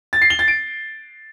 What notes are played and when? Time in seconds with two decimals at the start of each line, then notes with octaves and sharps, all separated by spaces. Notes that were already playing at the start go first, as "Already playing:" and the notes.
0.13 A6
0.22 C7
0.30 G7
0.39 A6
0.48 D7